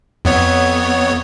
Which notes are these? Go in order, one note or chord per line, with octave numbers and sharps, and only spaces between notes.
F2 B3 C#5